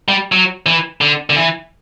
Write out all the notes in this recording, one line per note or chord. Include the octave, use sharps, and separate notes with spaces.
G3
F#3
E3
D3
D3
E3